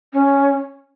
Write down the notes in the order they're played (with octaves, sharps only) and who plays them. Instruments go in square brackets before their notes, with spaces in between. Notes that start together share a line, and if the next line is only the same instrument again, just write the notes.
[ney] C#4